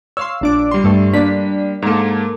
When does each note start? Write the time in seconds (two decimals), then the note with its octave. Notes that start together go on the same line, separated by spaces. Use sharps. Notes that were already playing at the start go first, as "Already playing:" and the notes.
0.17 C#5 F5 C6 E6
0.41 A#1 D4 D6
0.71 G3 C6
0.84 G2 A3
1.13 A#3 D4 B6
1.82 G#2 A#3 A4 A#4